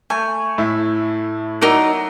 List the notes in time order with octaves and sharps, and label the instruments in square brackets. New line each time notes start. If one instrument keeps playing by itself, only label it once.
[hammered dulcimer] A3 [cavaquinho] G#5
[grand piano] A2 E4
[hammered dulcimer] F#3 [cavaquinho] D#4 A#4 D5